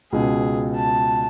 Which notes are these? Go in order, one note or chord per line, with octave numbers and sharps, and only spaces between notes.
C#2 B2 G#4
A5